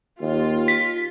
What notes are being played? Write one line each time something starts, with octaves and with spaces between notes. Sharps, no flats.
D#2 F4
B6